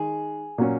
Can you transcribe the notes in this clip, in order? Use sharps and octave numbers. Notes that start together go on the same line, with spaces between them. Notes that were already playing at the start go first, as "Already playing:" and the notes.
Already playing: D#3 G#3 G#4
A#2 F#3 C#4